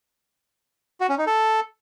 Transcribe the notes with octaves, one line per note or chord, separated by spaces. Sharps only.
F#4
C#4
D#4
A4